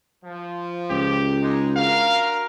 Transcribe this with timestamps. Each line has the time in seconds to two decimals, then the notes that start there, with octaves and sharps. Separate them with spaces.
0.24 F3
0.90 C#2 G4
1.41 G#3 D#4
1.76 D4 F#4 A#4 F5